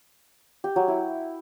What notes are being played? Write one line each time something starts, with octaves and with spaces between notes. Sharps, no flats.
G4
F#3
E4